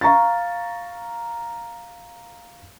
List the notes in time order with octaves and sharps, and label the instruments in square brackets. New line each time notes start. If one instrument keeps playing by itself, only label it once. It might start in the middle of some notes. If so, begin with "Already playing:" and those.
[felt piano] F5 A#5 C#6 A6